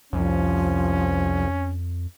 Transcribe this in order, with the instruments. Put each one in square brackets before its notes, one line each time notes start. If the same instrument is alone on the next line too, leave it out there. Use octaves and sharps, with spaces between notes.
[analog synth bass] C2 [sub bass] F2 [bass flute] F3 [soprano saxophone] C#4